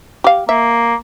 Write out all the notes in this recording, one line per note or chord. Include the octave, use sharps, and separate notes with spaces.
G4 F5
A#3 E5